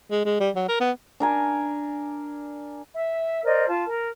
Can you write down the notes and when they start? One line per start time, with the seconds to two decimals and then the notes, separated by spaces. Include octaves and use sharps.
0.11 G#3
0.25 G#3
0.40 G3
0.56 F#3
0.69 A#4
0.80 B3
1.20 D4 A#4 G#5
2.94 E5
3.44 A#4 C5 D5 D#5
3.68 F4 A5
3.86 A#4